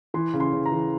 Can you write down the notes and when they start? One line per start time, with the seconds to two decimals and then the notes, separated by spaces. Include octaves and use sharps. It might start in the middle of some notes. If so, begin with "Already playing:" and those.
0.14 E3 C6
0.34 C#3
0.40 C6
0.53 C#3
0.66 A#5
0.72 E3